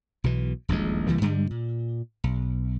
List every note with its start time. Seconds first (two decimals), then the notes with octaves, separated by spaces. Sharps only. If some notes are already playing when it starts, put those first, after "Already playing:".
0.24 B1 B2 E3
0.68 D#1 A#1 E2 G#3
1.07 C2 E3 G3 A#3
1.21 G2 D3 G3 G#3
1.51 A#2
2.24 B1